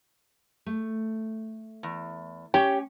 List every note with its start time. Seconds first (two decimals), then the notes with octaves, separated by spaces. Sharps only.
0.66 A3
1.83 E2
2.54 C#4 G4 C#5 G5